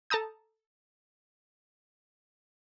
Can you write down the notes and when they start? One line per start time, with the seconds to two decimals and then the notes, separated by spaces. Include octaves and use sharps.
0.10 A4 A5 A#5 D#6 G6